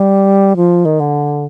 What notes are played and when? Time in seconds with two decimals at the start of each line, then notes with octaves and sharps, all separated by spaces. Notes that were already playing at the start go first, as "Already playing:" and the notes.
Already playing: G3
0.56 F3
0.85 D#3
1.00 D3